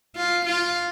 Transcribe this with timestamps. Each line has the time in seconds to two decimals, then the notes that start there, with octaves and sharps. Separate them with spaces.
0.16 F4
0.46 F4